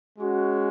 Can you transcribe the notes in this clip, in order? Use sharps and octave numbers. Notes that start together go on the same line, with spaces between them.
G#3 C#4 F#4